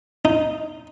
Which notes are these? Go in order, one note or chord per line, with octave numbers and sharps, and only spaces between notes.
D#4